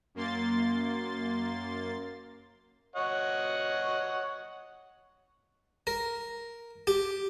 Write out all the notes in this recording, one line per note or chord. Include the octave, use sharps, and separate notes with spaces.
F#2 A#3 C6 A6
C#5 D#5 F#5
A#4
G4